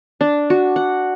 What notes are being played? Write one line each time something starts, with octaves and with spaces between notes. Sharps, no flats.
D4
F#4
F#5